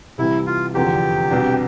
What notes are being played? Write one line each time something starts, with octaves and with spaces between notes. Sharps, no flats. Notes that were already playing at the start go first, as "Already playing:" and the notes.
C2 C3 E3 G3 E4
F4
F1 E2 D3 F3 B3 G4
C2 B2 B3 D4